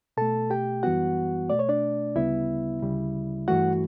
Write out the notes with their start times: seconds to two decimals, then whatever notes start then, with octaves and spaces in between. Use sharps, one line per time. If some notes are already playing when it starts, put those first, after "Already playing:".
0.17 B2 A3 A4 A5
0.50 G4 G5
0.83 F#2 E3 G3 B3 F#4 F#5
1.50 B2 A3 D5
1.59 C#5
1.69 D4 D5
2.15 D2 C#3 G3 B3 E4 E5
2.82 D2 C#3 G3
3.48 G2 E3 A3 F#4 F#5